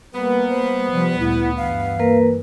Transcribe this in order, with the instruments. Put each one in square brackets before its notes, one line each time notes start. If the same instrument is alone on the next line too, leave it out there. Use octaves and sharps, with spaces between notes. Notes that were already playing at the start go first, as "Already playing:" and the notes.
[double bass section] G3 A#3 [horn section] B3 [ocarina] B4
[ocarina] C5
[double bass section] C3 F3 G3
[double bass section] D2 A#2 [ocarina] E4
[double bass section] G2 E3 [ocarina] F5
[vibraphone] A#3 A#4 B4